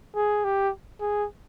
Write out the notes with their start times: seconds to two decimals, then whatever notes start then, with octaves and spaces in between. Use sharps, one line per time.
0.15 G#4
0.44 G4
1.01 G#4